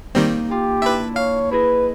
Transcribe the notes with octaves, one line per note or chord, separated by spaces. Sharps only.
D#3 G3 A#3 C4 D#4
F4 G4
D4 E4 B4 E5
C#5 F5
E4 G#4 B4 D#5